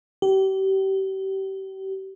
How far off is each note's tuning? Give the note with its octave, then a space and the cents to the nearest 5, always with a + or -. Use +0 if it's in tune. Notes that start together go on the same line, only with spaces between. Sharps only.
G4 -30